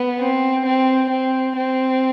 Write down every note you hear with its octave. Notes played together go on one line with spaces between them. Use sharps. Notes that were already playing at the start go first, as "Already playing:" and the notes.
Already playing: B3
C4
C4
C4
C4